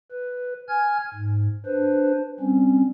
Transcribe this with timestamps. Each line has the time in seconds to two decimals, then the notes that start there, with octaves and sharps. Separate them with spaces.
0.12 B4
0.69 G#5 F6 G#6
1.14 G#2
1.66 D4 B4 C5
2.40 G3 C4 C#4